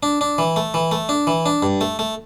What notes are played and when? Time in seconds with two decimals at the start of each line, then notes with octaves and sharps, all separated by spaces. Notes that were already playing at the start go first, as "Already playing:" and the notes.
0.03 D4
0.21 D4
0.38 E3
0.56 A3
0.74 E3
0.92 A3
1.09 D4
1.27 E3
1.46 D4
1.63 G2
1.81 A3
1.99 A3